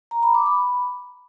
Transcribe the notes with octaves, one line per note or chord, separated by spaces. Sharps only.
A#5
B5
D6
B5